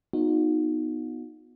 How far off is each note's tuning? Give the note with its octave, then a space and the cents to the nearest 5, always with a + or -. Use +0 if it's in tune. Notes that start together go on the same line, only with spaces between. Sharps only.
B3 +0 D#4 +0 F#4 -40